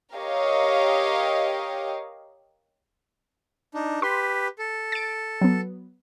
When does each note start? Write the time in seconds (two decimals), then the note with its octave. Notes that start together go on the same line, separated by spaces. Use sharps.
0.16 G4 A#4 C#5 D#5 F5
3.74 D4 D#4
4.02 G4 B4 C6
4.59 A4
4.92 A6 D7
5.41 F#3 B3